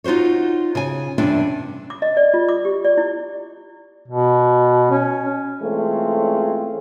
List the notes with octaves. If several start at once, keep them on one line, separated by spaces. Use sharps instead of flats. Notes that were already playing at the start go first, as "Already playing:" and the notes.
D#4 F4 F#4 C5 C#5
C#3 G#5
E2 G2 C3 C#4 D4
D6
D#5
D5
F4
D6
G4
D5
E4
B2
C#4
E3 G#3 A3 C4 C#4 F4